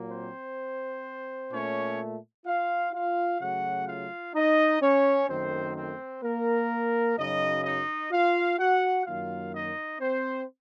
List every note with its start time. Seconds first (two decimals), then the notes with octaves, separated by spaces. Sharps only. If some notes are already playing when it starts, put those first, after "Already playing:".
Already playing: A#2 F#3 A#3
0.11 C4 C5
1.52 A#2 A3 C#4 C#5
2.46 F4 F5
2.93 F4 F5
3.40 C#3 F#3 A3 F#4 F#5
3.88 F4 F5
4.35 D#4 D#5
4.82 C#4 C#5
5.29 F#2 D#3 A3 C4 C5
5.76 C4 C5
6.23 A#3 A#4
7.18 F#2 C#3 F#3 D#4 D#5
7.65 D#4 D#5
8.12 F4 F5
8.59 F#4 F#5
9.06 F#2 D#3 F#3 A#3 F4 F5
9.53 D#4 D#5
10.00 C4 C5